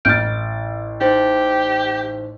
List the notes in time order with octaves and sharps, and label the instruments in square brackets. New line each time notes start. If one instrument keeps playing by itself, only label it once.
[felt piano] A1 A6 [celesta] F6 G6 D7
[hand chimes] D#4 C5 [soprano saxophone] G4